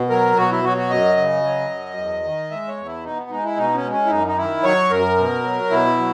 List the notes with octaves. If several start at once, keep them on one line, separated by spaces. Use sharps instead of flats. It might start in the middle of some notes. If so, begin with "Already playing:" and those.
Already playing: B2
F#3 A#4
B2 F#4
E4
F#3 F#4
F#4
F#2 D#5
C#3
F#3
F#2
E2
D#3
G#3 E5
C#5
E2
E4
B2 D#4
B3
G#3 D#4
E4
B2 D#4
C#4
G#3
C#4
E4
F#2 D#4
D#4
D#3 E4
F#3 C#5
F#2 A#4
B2
F#3
B2 E4
F#3